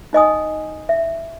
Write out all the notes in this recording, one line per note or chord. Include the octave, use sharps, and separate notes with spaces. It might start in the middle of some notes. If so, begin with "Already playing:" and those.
D#4 D#5 G#5 D#6
E5